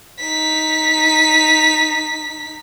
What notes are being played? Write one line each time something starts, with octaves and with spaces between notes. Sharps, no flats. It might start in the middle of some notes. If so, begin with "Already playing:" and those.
D#4 B6